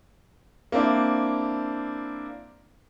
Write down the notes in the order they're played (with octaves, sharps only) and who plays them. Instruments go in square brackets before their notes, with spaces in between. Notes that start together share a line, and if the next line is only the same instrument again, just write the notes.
[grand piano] A#3 C4 D4 E4